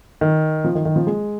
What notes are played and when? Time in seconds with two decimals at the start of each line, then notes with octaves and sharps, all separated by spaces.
0.21 D#3
0.64 F3
0.75 D#3
0.85 D#3
0.96 F3
1.07 G#3